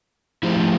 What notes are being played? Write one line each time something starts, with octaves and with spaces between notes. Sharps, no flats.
F3 A3 E4 G4 C5